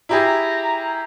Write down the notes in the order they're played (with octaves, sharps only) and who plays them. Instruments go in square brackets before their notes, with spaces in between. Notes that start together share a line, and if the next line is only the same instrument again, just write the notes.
[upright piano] E4 G4 G#4 [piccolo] A#5